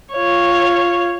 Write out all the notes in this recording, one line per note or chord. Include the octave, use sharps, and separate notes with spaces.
F4 C#5